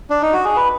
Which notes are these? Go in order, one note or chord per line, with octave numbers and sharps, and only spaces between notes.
D4
D#4
F#4
G#4
B4